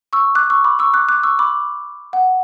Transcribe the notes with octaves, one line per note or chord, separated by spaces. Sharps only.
C#6 E6
D6 F#6
C#6 E6
B5 D6
C#6 E6
D6 F#6
D6 F#6
C#6 E6
B5 D6
F#5